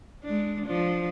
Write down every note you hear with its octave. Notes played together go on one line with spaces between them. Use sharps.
G#3 D4
F3 D4